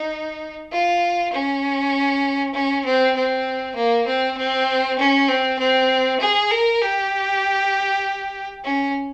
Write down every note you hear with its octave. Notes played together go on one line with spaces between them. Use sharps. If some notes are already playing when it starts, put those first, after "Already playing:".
Already playing: D#4
F4
C#4
C#4
C4
C4
A#3
C4
C4
C#4
C4
C4
G#4
A#4
G4
C#4